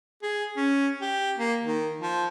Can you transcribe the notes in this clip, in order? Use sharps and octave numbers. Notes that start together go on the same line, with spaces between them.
G#4
C#4
G4
A#3
D#3
F3